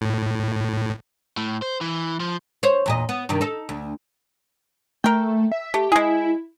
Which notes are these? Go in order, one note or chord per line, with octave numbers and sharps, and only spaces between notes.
A2
A2
C5
E3
F3
C5 C#5
E2 A#2 D#5
B3
G2 C3 D#3
D#4 A4
D2
A3 A#4 G5
E5
A3 G4
G#3 E4 G#4